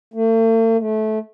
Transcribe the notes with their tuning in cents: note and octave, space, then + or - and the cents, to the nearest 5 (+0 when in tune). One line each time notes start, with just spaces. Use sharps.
A3 +45
A3 -20